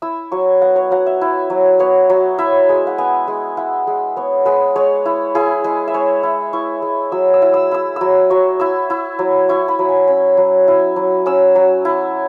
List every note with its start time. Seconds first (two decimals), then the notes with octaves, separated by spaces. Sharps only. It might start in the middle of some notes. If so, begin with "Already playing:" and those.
0.02 E4 E6
0.32 F#3 C#6
0.62 B3 F#5
0.76 C#5
0.91 F#3 F#5
1.06 E5
1.21 E4
1.50 F#3
1.79 B3 C#5
2.10 F#3
2.38 E4 E5
2.69 G#3
2.87 F#5
2.98 B3 G#5
3.28 G#3
3.57 E4 F#5
3.87 G#3
4.17 B3 C#5
4.46 G#3 B4
4.76 G#3 C#5
5.06 E4
5.35 E4 G#4
5.64 G#3 G#4
5.88 E5
5.94 G#3 C#5
6.23 E4
6.53 E4 C#6
6.82 G#3
7.12 F#3 E6
7.34 E6
7.42 E4
7.54 E6
7.71 E4 E6
7.96 F#3 E6
8.30 F#3 C#6
8.60 E4 E6
8.90 E4
9.19 F#3
9.49 E4 C#6
9.68 B5
9.79 F#3
9.89 G#5
10.08 C#4 B5
10.37 F#3
10.68 E4
10.96 F#3
11.26 C#4 E6
11.55 F#3
11.85 E4